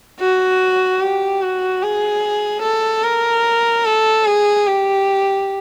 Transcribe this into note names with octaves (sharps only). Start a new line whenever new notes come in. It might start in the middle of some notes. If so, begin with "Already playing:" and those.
F#4
G4
F#4
G#4
A4
A#4
A4
G#4
G4